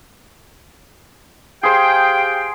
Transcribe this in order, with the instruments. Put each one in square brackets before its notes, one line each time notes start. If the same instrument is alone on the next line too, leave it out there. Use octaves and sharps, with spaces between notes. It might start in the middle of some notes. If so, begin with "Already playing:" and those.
[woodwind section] G4 F5 G5 [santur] G#4 C5